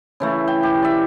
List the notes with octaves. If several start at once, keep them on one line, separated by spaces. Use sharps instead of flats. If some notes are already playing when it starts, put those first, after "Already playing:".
C#3 E3 A3
G5
G4
D5 E5